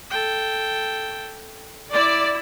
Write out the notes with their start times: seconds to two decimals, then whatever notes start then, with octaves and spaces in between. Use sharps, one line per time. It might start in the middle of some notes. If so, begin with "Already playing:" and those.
0.10 A4 G5
1.93 E4 D5